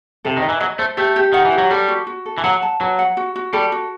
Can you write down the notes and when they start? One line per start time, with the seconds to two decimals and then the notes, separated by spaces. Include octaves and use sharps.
0.25 C3 A4
0.37 D#3
0.42 D#5
0.49 E3
0.60 F#3 D#5
0.79 A3 C5
0.97 A3 G4
1.16 G4
1.33 D#3 F#5
1.45 E3
1.52 G4
1.58 F#3
1.71 G3 A4
1.88 F#4
2.07 F#4
2.26 A4
2.38 E3
2.44 F#3 F#5
2.62 A5
2.80 F#3 B4
2.99 F#5
3.17 F#4
3.36 F#4
3.53 G3 A4
3.72 F#4